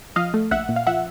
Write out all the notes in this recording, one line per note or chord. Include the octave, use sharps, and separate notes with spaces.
F3 D#5 F5
A3
A#1 E5 F#5
A#2
F5
F3 E5 F#5